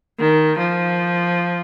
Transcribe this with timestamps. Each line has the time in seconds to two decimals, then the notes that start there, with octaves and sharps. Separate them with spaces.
0.19 D#3
0.58 F3